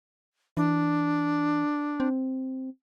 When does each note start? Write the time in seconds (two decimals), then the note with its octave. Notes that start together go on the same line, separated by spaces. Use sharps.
0.57 E3 D4
2.00 C4